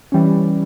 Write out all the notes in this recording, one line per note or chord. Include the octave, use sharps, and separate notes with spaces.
E3 G3 C#4